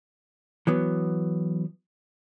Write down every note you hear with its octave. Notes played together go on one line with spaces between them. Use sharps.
E3 F#3 B3